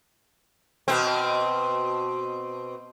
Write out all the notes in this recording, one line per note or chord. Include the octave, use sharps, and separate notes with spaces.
B2 C4